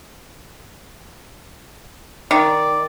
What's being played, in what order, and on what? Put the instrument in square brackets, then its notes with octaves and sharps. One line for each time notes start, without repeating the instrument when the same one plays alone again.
[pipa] D#3 [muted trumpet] D5